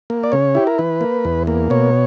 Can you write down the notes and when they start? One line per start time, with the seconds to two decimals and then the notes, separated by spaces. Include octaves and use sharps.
0.10 A#3
0.24 D5
0.32 C#3 C#5
0.55 E4 G4
0.67 A#4
0.79 E3 B4
1.01 A#3
1.25 E2
1.47 A#3
1.70 B2 C#5